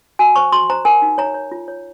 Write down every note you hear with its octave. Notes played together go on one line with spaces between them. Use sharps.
F#4 G#5
C5 C#6
F#4 C6
C5 A#5
A#4 G#5
D#4
C#5 A#5
C#5
F4
C#5